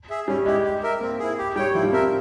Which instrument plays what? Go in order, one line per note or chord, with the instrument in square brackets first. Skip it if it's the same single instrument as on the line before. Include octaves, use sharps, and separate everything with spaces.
[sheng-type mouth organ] G#4 E5
[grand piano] G3 [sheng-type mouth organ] C#4
[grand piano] G#3 [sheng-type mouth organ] E4 G4
[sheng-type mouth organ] G4
A#4 E5
[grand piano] A#3 [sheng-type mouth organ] C4
[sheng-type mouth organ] E4 G#4
G4
[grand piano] G3 [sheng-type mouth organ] C#5 G5
[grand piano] F3 [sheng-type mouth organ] E4
[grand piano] G3
[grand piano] C4 [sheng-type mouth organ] A#4 E5